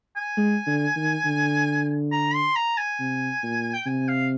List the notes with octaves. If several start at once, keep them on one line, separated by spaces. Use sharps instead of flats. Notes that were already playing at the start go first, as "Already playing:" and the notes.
G#5
G#3
D3
D#3
D3
A#5
C6
A#5
G#5
C3
A#2
G5
C3 G#5
F5